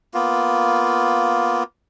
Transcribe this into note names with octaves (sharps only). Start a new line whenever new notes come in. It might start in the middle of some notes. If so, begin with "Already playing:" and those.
A#3 B3 F4